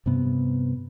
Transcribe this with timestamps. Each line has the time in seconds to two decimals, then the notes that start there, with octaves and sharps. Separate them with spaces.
0.06 G2 C3 B3